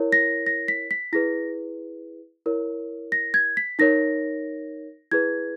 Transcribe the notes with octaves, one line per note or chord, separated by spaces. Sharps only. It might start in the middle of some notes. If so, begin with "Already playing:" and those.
Already playing: E4 A#4 C#5
A#6
A#6
B6
B6
E4 G#4 B4 A#6
E4 A#4 C#5
A#6
G#6
B6
D#4 A#4 C#5 A#6
E4 G#4 B4 G#6